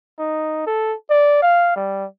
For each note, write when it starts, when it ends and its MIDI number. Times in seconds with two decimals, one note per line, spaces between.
0.18 0.64 63
0.66 0.94 69
1.10 1.39 74
1.42 1.71 77
1.76 2.05 55